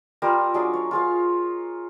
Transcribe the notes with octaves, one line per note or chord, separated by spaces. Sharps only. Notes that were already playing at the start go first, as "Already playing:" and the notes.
G3 F4 A#4 E6
F#3 D4 D#4 G#4
C#5
F4 G#4 F5